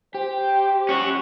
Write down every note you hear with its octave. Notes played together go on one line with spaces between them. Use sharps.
G4 C5 G5
C#4 F#4